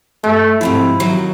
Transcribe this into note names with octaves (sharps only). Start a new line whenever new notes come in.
G2 A3
G#2 C3 F3 E4
D#2 D#3 F#3